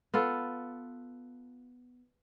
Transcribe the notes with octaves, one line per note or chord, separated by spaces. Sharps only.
B3 F4 A4